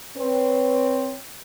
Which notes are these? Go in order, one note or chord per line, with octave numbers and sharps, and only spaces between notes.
C4 B4 C#5